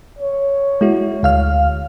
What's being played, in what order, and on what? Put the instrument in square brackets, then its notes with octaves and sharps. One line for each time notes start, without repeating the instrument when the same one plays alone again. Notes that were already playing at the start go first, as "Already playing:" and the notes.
[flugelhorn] C#5
[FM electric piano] G#3 E4 F#4
D2 F5 F6